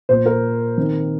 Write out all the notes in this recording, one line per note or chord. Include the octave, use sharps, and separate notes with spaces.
A#2 A#3 C5
A#4
D#3 C4